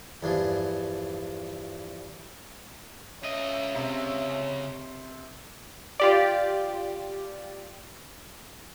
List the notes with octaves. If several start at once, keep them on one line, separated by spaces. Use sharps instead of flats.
E2 G2 F3
C#3 C#5 D#5 E5
C3
F4 G4 D5